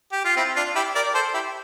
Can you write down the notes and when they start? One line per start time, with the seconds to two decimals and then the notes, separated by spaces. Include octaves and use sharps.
0.12 G4
0.24 F4
0.37 C4 E4
0.56 D4 F4
0.75 E4 G4
0.95 A#4 D5
1.14 A4 C5
1.34 E4 G4